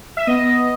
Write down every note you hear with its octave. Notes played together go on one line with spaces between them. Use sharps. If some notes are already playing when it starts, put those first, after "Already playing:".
E5
B3 D#5